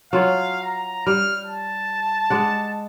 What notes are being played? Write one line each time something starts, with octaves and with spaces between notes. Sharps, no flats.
F#3 F4 C#5 F5
A#5
G3 F6
A5
G#3 D5 F#5